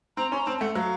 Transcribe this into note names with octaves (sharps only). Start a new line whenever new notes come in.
C4 A#5
C#4 C6
A#5
C4 A5
A5
A3 F#5
F#3 F5